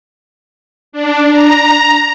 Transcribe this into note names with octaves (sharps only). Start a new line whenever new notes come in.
D4
A#5